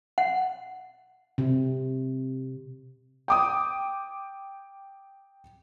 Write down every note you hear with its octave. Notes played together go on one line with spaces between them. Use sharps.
F#5
C3
G5 D6 D#6